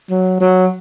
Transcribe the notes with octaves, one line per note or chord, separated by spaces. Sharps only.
F#3
F#3